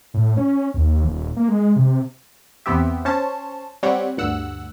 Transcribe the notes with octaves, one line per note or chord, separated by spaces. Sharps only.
A2
C#4
D#2
D#1
A#3
G#3
C3
E2 B3 C4 G4 E5
C#4 C5 C#5 A5
G3 C4 G4 C#5 F#5
D2 G2 F#5 E6